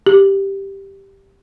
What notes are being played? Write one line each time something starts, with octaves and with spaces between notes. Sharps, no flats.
G4